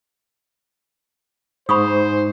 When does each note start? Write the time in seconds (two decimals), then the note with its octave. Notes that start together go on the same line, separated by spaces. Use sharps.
1.69 G#2 C5 B5 C#6 D#6